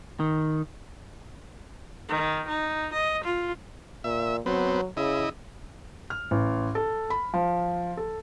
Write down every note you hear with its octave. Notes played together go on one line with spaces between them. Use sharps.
D#3
D#3
D#4
D#5
F4
A#2 E5
F#3 B3 C4
C#3 E4 D#5
F6
A1
A4
B5
F3
A4